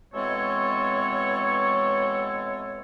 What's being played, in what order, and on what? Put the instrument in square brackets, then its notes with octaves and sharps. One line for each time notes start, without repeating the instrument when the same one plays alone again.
[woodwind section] B2 E3 G#3 C4 A4 C#5